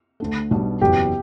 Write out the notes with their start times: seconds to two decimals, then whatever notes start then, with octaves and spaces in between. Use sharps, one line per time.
0.20 D2 D3 A3
0.51 B1 B2 G3 D4
0.81 F#1 E2 B2 F#3 G4